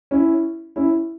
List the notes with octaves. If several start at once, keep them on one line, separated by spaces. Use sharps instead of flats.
C#4 E4
C#4 E4